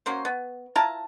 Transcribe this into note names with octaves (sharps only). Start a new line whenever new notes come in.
F#3 A#3 C#4 C5
B3
E4 F4 A5 A#5